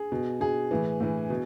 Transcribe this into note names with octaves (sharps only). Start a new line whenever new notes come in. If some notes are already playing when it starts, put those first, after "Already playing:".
Already playing: G#4
B2
B2 G#4
A2 E3
A2 E3
B2